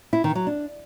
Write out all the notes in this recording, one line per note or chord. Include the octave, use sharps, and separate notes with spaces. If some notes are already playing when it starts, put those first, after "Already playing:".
E4
D#3
F#3
D4